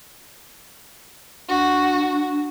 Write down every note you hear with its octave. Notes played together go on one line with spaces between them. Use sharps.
D4 F#4